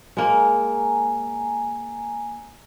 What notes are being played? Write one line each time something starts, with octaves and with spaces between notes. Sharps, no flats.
G#3 A#3 G#5 A#5